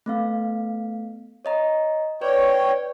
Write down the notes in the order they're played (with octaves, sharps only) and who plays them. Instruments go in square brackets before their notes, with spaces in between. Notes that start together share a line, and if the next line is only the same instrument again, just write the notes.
[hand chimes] A3 B3 F5
C#5 D#5 A#5
[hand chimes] B4 D5 [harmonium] C#5 G5